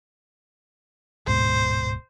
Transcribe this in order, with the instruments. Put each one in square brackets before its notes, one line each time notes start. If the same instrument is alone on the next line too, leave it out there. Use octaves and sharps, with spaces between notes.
[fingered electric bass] D1 G#2 B2 [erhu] C5